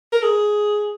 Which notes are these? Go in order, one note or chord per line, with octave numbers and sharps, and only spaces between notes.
A#4
G#4